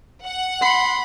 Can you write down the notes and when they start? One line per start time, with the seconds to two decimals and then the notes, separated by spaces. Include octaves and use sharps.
0.25 F#5
0.62 B5 C6